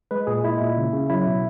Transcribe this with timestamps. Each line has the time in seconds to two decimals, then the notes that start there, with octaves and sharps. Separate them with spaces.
0.11 G#3 B4
0.27 A#2 G#4
0.44 G#3 E4
0.61 A#2
0.77 C#3
0.93 C#3
1.10 F#3 E4
1.26 B2